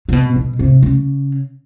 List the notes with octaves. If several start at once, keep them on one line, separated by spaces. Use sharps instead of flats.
C3
B2
B2
C3
C#3